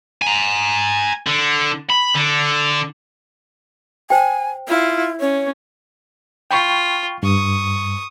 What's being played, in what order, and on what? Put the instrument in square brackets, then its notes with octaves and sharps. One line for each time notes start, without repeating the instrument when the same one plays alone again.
[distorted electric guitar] G#5 A#5
D3
B5
D3
[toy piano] C5 G5 [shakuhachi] G#5
[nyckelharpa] E4 [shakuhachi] F4
[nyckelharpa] C#4 [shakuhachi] C#5
[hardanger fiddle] F4 [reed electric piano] G5 B5 C#6
[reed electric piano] G2 [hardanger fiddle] C#6 D#6